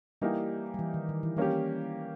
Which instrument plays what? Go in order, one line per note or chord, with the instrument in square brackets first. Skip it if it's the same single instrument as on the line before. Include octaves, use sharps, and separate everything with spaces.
[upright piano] E3 A#3 D#4 G4 [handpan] G3
[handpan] G3
E3
D#3
D#3
E3
[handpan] G3 [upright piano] A#3 C#4 G4